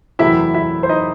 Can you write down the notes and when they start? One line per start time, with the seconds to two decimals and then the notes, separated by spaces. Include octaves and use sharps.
0.19 F#1 E2 C3 F#3 A3 E4 E5
0.54 E4 E5
0.83 C5
0.89 D#4 D#5